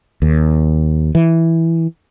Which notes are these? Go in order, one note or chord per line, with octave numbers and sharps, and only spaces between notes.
D#2
E3